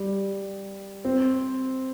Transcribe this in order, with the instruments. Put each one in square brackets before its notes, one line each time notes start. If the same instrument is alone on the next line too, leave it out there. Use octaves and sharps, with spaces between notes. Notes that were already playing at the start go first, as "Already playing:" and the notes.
Already playing: [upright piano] G3
C4